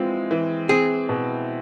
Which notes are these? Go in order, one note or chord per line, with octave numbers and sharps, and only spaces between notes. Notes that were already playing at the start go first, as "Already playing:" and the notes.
Already playing: E3 G#3 C4 F4
E3
C4 G#4
B2